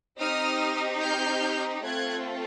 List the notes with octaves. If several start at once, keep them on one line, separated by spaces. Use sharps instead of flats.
C4 D#4 G4 D#6 F6
F6 G6
A3 C4 F4 A4 F#6 G#6